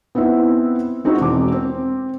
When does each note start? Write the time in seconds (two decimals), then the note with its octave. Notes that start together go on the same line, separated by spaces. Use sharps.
0.15 B3 C4 D#4 E4
1.04 G#3 C4 D#4 E4 F#4
1.20 E1 D6
1.52 C4